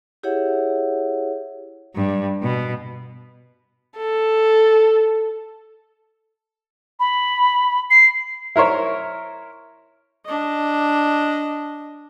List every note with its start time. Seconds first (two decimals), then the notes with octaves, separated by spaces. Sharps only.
0.23 E4 G4 G#4 C#5 E5 F#5
1.95 G2
2.42 B2
3.98 A4
7.00 B5
7.90 C7
8.56 E4 A#4 C5 C#5
10.26 D4 D#5